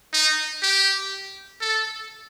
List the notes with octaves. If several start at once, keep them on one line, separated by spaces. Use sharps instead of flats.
D#4
G4
A4